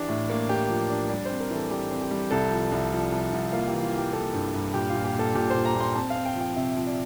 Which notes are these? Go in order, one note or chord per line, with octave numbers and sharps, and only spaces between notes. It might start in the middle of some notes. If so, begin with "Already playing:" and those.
Already playing: E3 D4 G4
A2
A#3
A#3 G4
F3
D4
G3 D5
C4 C5
A#4
E3
A4
G3 G4
C4
G4
G3
C2 A4
F3
C2
F3
C2
C2
A#3 F4
G4
E3
F4
E3 G4
A#3 A4
G2
G2
A#2 G4
F4
A#2
G4
A#2 A4
A#2 G4
A#2 C5
A#5
A#2
C6
C4 A5
F5
C4
G5
F3
G5
C3 E5
F3
D5